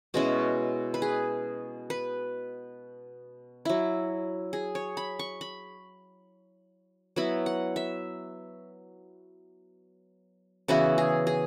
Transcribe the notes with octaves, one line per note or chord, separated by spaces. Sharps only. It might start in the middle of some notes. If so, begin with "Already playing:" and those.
B2 G#3 C#4 E4 F#4
B4
G#4
B4
F#3 E4
G#4
C#5
B5
C#6
B5
F#3 B3 E4 B5
F#5
E5
C#3 E3 B3 E4 F#4
G#4
G#4